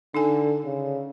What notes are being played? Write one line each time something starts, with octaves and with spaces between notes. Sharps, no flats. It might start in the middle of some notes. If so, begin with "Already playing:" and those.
D3 D#4 A4 G#5
C#3